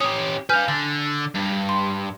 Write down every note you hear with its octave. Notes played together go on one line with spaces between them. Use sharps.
C#4 G4 D#6
B4 F5 G#5 F6 G6
D3 A6
G2
C6